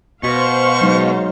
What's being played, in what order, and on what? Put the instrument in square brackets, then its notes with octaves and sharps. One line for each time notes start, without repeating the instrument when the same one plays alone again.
[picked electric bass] B2 [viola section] C5 F5 [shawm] C#6
[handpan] F#3 G#3 D#4